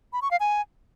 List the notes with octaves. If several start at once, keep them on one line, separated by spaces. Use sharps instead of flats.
B5
C#6
F5
G#5